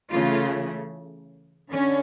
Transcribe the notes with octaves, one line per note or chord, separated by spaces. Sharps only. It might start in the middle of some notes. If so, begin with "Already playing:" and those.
C#3 E3 A3 F4
D3 C#4